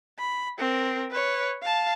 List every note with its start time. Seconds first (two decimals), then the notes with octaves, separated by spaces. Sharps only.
0.19 B5
0.58 C4 A#4
1.11 B4 C#5
1.63 F5 A5